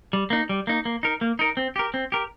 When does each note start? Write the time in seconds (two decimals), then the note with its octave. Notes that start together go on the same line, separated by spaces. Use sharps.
0.13 G3
0.30 A#3 D#4
0.49 G3
0.67 A#3 D#4
0.85 A#3
1.03 D#4 A#4
1.21 A#3
1.39 D#4 A#4
1.57 C4
1.76 G4 A#4
1.94 C4
2.12 G4 A#4